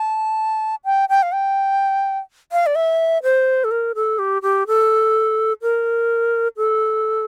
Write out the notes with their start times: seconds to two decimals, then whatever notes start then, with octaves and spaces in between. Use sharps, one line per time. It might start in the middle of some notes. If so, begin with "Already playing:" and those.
Already playing: A5
0.85 G5
1.09 G5
1.22 F5
1.32 G5
2.52 F5
2.66 D5
2.75 E5
3.23 C5
3.64 A4
3.71 A#4
3.95 A4
4.19 G4
4.42 G4
4.67 A4
5.62 A#4
6.57 A4